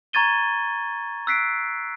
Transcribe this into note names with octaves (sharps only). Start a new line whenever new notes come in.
A#5 C#6 G#6 A6 D#7 G7
E6 F#6 B6 C7 D7